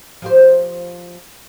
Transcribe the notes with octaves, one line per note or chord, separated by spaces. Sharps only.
F3 G4 C5